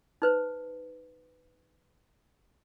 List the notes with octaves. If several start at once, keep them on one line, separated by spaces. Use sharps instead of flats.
D#4 B4 C5